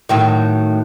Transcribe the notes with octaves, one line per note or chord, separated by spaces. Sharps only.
A2 D#3 F#3